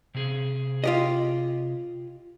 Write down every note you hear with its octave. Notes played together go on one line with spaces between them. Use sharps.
C3 G#4
F4 G4 D#5